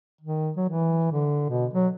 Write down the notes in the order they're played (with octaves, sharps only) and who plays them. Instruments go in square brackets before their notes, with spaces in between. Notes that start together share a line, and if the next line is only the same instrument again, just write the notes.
[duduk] D#3
F#3
E3
D3
B2
F#3